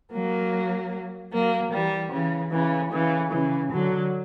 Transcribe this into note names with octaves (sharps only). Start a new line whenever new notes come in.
F#3 A#3
F#3 A#3
E3 G3
C#3 E3
C#3 E3
C#3 E3
C#3 E3
D3 F#3